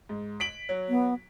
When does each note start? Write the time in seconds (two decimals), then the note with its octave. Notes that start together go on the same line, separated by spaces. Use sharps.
0.09 G#2
0.40 B6 D7 F#7
0.69 F#3
0.89 B3